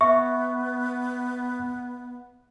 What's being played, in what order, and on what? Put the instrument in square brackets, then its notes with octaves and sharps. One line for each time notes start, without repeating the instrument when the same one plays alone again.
[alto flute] B3 [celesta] E5 [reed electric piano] C#6